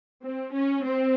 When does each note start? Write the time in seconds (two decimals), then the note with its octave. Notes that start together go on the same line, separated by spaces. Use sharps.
0.23 C4
0.53 C#4
0.83 C4